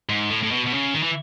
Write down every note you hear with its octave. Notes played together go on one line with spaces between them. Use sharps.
G#2
A2
A2
B2
B2
C#3
D#3
E3